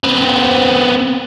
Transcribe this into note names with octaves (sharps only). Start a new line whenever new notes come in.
B3 C4